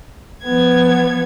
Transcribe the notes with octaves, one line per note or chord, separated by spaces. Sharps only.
F3 B3 G#6